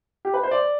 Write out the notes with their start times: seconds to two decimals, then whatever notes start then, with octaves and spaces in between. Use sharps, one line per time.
0.25 G4
0.34 B4
0.43 C5
0.51 D5